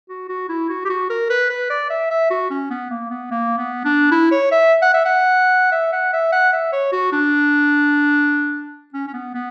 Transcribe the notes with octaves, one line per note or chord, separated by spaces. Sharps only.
F#4
F#4
E4
F#4
G4
F#4
A#4
B4
B4
D5
E5
E5
F#4
C#4
B3
A#3
B3
A#3
B3
D4
E4
C#5
E5
F#5
E5
F#5
E5
F#5
E5
F#5
E5
C#5
F#4
D4
C#4
C#4
B3
B3